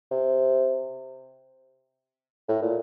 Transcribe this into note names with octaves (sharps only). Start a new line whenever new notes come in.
C3
A2
A#2